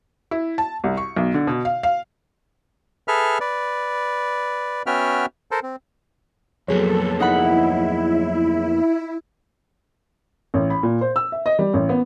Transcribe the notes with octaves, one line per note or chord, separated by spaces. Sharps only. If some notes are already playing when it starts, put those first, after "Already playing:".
E4
A5
C2
C#6
B1
D3
B2
F5
F5
G#4 A4 B4 E5 F6
B4 D5
B3 C#4 F#4 E5 G5 F6
A4 A#4 C5
C4
F2 F#3 A#3 B3 G#4 A4 C#5
D#4 E4 F#5 B5
A1
B5
A#2
C5
E6
E5
D#5
G3
A1
B3